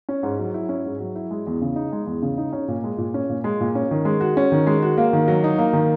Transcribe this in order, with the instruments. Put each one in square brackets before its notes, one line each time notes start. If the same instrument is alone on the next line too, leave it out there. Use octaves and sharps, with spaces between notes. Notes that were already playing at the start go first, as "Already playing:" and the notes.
[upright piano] C#4
G#2
F#3
E4
C#4
G#2
F#3
E4
G#3
E2
C#3
D#4
G#3
E2
C#3
D#4
C#4
A#2
G#3
A#2
C#4
A#2
G#3
A#2
C#4
D#3
G#3
F#4
C#4
D#3
G#3
F#4
A#3
D#3
F#3
D#4
A#3
D#3